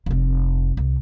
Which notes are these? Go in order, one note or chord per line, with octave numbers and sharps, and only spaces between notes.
F1 C4
C2